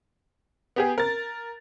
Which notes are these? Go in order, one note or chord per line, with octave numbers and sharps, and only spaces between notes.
B3 G4 G#4
A#4 A6